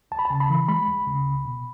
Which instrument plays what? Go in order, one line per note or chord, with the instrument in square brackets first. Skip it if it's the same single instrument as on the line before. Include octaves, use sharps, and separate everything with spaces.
[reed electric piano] D2 A5
B5
C#3 A5
B5
E3
G#3 B5
D2
C#3
C#2
B2